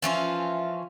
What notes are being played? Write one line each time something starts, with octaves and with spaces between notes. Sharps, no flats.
E3 F3 C#4 F4